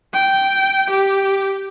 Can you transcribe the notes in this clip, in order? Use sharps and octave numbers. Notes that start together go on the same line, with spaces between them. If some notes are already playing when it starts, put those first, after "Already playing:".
G5
G4